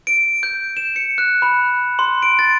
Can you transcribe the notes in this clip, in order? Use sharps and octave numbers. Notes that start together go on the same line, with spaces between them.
D7
G6
E7
C#7
F#6
B5
C6
D7
A6